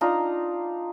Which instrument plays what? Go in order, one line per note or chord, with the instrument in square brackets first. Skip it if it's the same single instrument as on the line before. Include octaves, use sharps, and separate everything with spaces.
[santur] D4 D#4 F4 A#5